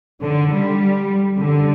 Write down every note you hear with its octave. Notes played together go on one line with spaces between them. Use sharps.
D3
G3
D3